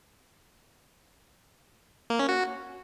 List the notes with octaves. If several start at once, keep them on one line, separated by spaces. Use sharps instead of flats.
A#3
C#4
F#4